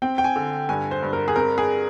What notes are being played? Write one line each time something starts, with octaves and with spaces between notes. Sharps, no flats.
C4 G5
G5
G#5
D3
G2 G#5
C5
G2
A#4
G#4
C4 A#4
G#4